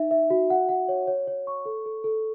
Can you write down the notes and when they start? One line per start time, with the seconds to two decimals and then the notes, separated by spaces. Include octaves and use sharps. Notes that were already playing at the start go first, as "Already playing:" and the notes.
Already playing: D#4 E5
0.11 E5
0.30 F#4
0.50 F#5
0.69 F#5
0.89 C#5
1.07 C#5
1.27 C#5
1.47 C#6
1.66 A4
1.86 A4
2.04 A4